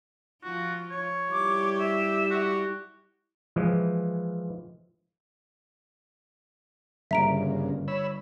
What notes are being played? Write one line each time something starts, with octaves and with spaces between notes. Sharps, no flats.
F3 F4 F#4
C#5
G3 E4 G4 D6
E5
F#4
E3 F3 G#3
G1 G2 C#3 A#3 E5 A#5 D7
C#5 B5 E6